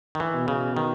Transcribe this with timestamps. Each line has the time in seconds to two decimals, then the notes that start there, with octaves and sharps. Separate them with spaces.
0.15 D#3
0.20 E3
0.34 B2
0.48 C#3
0.77 D#3